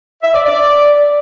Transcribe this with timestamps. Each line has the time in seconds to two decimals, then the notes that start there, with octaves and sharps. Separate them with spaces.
0.22 E5
0.34 D5
0.45 D5